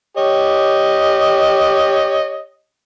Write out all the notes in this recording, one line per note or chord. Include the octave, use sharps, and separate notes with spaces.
G4 C#5 D#5